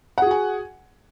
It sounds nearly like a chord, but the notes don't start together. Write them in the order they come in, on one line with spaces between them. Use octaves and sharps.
F#5 G#4 F#4 G#5